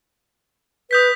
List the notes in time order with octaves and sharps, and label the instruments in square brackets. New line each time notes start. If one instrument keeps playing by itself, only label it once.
[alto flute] B4 [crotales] D#6 G6 B6